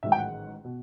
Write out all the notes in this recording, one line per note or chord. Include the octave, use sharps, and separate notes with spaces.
A1 G#2 D#3 F#3 E5
G5
F#5
B2